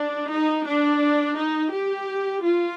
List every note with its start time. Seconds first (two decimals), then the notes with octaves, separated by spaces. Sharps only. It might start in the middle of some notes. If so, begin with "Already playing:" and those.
Already playing: D4
0.30 D#4
0.65 D4
1.35 D#4
1.71 G4
2.42 F4